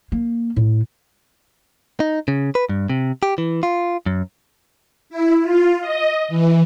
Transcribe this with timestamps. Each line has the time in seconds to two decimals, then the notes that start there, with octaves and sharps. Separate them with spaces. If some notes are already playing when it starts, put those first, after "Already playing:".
0.12 A#3
0.56 A2
2.00 D#4
2.28 C#3
2.55 B4
2.69 G2
2.90 C3
3.23 G4
3.38 E3
3.63 F4
4.06 F#2
5.10 E4
5.43 F4
5.81 D#5
6.28 E3